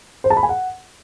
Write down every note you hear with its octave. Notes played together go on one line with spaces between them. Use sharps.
C5
A5
B5
G#5
F#5